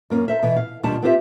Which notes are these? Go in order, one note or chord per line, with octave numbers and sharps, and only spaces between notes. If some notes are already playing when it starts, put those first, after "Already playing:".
F#2 A#3 C#4
A4 C5 E5
B2 E3
F5
D#2 B2 F3 G3 D4 A5
B3 C4 F4 G4 C5 E5